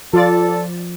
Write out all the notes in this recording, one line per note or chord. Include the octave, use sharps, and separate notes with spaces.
F3 F4 A4 D5 A6